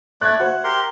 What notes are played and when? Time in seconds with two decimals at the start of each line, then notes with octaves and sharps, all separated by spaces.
0.21 A3 D5 F#6 G#6
0.39 F#4 C5 E5 F#5
0.64 G4 A#4 C6